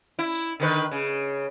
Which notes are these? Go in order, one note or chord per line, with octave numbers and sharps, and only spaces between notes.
E4
D3 D#3 B4
C#3